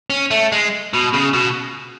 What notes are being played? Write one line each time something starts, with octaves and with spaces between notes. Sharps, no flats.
C#4
A3
G#3
B2
C#3
B2